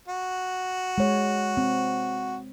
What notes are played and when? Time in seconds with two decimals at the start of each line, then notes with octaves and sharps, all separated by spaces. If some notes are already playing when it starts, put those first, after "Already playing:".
0.08 F#4
0.98 G#3 C#5
1.57 C4